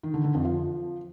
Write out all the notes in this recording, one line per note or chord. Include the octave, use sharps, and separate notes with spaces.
D#3
D3
D3
F2
F3